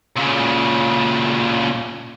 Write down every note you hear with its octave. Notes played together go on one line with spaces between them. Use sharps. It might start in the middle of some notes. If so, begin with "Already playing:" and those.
A#2 C#3